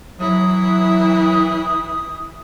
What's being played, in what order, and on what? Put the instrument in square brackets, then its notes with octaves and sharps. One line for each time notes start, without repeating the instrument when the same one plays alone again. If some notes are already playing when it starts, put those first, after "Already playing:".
[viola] E3 E4 [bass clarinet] F#3 [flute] D#6